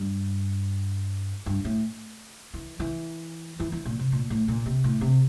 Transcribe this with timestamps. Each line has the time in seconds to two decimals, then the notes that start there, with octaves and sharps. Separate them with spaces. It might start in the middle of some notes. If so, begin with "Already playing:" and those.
Already playing: G2
1.46 G2
1.65 A2
2.54 E3
2.80 E3
3.60 E3
3.72 E3
3.85 A#2
3.99 C3
4.12 A#2
4.30 A2
4.48 A#2
4.66 C3
4.84 A2
5.01 C3